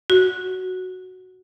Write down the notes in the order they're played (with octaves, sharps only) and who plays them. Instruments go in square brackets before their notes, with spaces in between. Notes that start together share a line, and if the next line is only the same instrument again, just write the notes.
[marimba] F#4